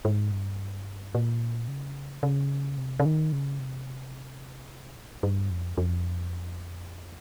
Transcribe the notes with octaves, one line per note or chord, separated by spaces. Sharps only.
G#2
G2
A#2
C#3
C#3
C3
C#3
D#3
C#3
C3
A#2
G2
F2
F2